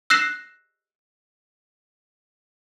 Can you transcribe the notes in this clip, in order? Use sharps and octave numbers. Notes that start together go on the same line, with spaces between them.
E6 F#6 A#6 C7 E7